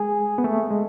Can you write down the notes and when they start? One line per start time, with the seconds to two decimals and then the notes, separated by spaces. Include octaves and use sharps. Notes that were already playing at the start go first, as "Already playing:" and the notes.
Already playing: G#3 G#4
0.38 B3
0.44 A3
0.71 G#3